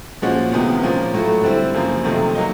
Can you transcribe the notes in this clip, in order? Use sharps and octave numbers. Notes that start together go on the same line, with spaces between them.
A#2 F3 G#3 C#4 F#4
E2 C3 D#3 G#3 B3
A#2 F3 A#3 C#4
A2 F#3 A3
D3 G3 C4 E4
F#2 C#3 F3 A#3
F2 C3 D#3 F#3 A3
F#3 A#3 D#4